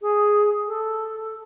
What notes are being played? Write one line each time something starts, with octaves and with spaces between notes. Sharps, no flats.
G#4
A4